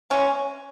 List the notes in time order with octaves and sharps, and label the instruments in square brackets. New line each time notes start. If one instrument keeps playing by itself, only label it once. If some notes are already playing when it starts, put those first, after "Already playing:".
[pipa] E3 G#3 B3 C#4